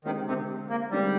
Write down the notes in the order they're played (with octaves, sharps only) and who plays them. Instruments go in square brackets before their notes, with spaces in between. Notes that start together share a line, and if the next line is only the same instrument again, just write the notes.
[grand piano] D3 G#3 C4 G4 C5 [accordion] D#3
[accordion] C3
A#3
[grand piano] D3 G#3 C4 G4 C5 [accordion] G3